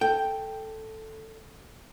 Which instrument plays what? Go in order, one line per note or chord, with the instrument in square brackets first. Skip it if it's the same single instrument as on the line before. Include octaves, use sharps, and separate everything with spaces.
[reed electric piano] A4 [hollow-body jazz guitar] G5